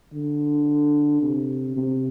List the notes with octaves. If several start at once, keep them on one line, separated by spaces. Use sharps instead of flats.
D3
C3
C3